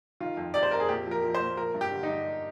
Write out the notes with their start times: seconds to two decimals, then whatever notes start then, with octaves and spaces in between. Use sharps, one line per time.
0.20 D#3 F4
0.37 F2
0.54 C3 D5
0.63 C5
0.71 F2 A#4
0.80 G#4
0.89 A#2 G4
1.06 F3
1.11 A#4
1.24 F3
1.35 C5
1.40 A#2
1.57 F3 A#4
1.74 G2
1.81 G4
1.92 D3
2.03 D#4
2.09 G2